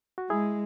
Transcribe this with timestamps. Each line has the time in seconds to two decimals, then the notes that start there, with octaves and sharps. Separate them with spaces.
0.18 F#4
0.29 G#3 E4 G#4